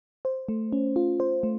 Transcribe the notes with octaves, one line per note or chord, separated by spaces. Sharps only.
C5
A3
C#4
F4
C5
A3